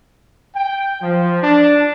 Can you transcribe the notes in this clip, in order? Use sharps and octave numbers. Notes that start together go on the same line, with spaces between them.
G5
F3
D4